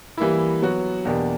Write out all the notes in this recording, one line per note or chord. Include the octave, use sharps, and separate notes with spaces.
E3 G3 A#3 E4
F#3 B3 F#4
E2 B2 A#3 D4 G4